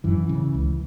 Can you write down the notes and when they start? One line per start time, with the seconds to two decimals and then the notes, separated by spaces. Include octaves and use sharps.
0.04 F#2 E3
0.29 C#3
0.55 C#2